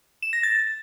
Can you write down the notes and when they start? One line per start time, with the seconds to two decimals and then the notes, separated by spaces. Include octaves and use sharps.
0.22 E7
0.33 A#6
0.43 A6